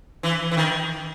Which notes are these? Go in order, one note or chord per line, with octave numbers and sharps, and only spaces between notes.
E3
E3
D#3